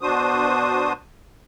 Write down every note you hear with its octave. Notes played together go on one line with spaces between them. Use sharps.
B2 D4 F#4 C5 D#6